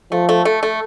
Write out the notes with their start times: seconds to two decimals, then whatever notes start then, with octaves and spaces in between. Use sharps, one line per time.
0.12 F3 A3
0.29 A3
0.45 A3
0.63 A3